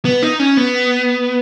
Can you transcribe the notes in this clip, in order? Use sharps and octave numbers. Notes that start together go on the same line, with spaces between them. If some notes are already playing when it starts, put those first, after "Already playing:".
B3
D#4
C#4
B3